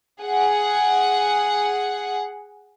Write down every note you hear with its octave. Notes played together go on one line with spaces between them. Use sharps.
G#4 F#5